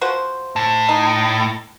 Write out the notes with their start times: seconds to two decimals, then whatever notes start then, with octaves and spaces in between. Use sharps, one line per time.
0.01 F3 F#4 C5
0.56 A2
0.89 D#4